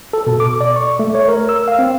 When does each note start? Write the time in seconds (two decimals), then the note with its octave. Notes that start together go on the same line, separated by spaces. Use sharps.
0.13 A4
0.27 B2
0.40 D6
0.61 D5
0.76 C#6
0.99 A3
1.15 C#5
1.29 A#4
1.49 E6
1.68 F5
1.79 C4